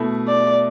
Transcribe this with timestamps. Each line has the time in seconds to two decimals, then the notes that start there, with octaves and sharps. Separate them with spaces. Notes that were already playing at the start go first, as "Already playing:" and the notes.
Already playing: B2 A3 E4
0.28 D5